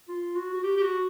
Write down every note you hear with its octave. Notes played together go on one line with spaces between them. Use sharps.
F4
F#4
F#4
G4
G4
F#4